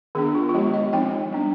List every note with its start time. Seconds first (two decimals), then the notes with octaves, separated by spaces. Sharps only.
0.15 D#3 B3 D4 G#4
0.35 F4
0.49 F4
0.54 F3 G#3 B3 G4
0.74 D#5
0.93 F3 C4 D#4 G5
1.31 G3 B3 D4